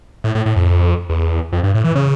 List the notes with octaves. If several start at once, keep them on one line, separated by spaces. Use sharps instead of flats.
A2
A2
A2
F2
E2
F2
G2
A2
E3
C#3